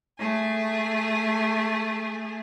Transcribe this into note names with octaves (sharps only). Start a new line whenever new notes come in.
A3 G#4